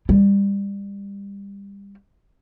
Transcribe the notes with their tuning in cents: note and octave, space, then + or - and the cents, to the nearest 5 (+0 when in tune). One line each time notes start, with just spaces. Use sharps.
G3 +25